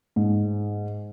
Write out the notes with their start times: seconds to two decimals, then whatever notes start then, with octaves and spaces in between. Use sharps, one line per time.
0.16 G#2